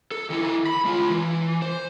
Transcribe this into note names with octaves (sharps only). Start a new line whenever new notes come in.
A4
D#3 E4
B5
G#3 F4
E3
C5